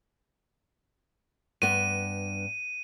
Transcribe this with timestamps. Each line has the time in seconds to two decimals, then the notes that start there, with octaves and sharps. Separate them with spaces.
1.62 G2 B3 D#7